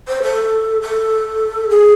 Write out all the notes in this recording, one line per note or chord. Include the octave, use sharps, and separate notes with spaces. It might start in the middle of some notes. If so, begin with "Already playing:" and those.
C5
A4
A4
G#4